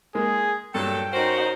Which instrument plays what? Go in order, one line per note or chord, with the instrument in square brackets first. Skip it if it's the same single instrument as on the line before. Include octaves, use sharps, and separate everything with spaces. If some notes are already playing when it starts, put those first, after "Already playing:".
[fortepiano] G#3 A#3 [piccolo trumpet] G#4
[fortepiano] G2 [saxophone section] A#2 F#3 A4 [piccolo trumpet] G5
[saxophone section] C#4 A#4 C5 [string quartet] D#4 F#4